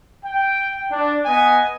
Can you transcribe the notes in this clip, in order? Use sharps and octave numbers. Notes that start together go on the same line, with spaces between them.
G5
D4
B3 D#5 G#5